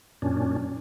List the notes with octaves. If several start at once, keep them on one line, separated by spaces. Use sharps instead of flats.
F#2 A#2 C#4 D4